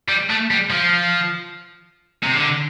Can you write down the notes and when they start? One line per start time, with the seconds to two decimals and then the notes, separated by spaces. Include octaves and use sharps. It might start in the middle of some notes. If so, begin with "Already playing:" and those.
0.09 G3
0.30 A3
0.50 G3
0.70 F3
2.23 C3
2.35 D3